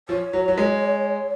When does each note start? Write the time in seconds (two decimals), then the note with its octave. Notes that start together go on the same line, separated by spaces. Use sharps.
0.09 F3 C#5
0.33 F#3
0.48 F#3
0.58 G#3